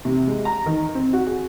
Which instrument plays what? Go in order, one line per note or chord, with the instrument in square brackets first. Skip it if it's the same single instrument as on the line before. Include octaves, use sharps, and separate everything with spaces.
[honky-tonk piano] C3
G#3
A#5
D#3
C4
F#4
G#4